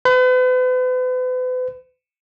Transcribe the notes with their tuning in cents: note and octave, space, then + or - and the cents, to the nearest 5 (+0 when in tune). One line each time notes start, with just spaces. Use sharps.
B4 +40